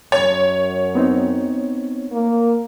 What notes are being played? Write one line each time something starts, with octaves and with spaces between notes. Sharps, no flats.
F#2 C#5
B3 C4 D#4
A#3